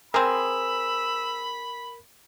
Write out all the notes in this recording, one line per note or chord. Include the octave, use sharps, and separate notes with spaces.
C4 G#4 A#4 B5 E6